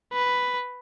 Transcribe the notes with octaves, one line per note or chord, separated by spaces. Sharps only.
B4